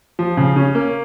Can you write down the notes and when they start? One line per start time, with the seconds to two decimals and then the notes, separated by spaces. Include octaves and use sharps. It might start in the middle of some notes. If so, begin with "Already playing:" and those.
0.19 F3
0.37 C#3
0.56 C#4
0.75 A#3